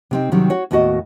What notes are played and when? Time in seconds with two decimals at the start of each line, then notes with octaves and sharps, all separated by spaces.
0.11 C3 C4 D#4
0.32 C3 D#3 F#3 G3 C4
0.50 F#4 C#5
0.71 D#2 A2 B3 F#4 D#5